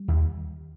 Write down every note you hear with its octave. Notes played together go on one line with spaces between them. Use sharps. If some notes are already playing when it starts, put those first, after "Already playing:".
Already playing: G3
D#2